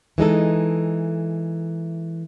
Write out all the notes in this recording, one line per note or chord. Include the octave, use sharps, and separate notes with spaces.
E3 G#3 D#4 A4